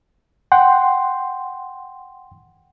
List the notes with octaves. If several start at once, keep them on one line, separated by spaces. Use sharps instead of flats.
F#5 G5 C6